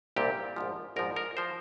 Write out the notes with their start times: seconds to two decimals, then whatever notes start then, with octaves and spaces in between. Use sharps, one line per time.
0.16 C2 A#2 G3 C4 G4
0.56 A#1 G#2 F3
0.96 A#1 G#2 F3 A#4
1.16 A#4
1.37 F3 C5